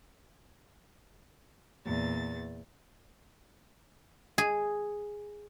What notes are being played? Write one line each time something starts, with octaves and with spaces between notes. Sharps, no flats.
E2 A#2 A6
G#4